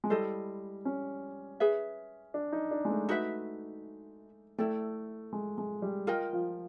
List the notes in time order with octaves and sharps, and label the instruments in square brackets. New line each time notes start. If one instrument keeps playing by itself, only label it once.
[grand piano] G#3
[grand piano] G3 [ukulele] E4 A4 C5 D#5
[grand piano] C#4
[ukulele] G#4 B4 E5
[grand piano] D4
D#4
D4
G#3
A3
[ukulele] D#4 F#4 B4 E5
[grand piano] A3 [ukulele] E4 A4 D5 G5
[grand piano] G#3
G#3
G3
[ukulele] F4 A#4 D#5 G5
[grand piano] F3